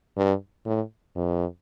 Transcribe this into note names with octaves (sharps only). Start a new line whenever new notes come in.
G2
A2
F2